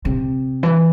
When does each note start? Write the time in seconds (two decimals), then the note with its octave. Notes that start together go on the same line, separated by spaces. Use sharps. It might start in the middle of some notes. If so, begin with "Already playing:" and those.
0.05 C3
0.63 E3